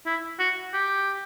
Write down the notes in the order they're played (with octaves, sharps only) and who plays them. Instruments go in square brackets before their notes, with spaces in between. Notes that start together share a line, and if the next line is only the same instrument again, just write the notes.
[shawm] E4
F#4
G4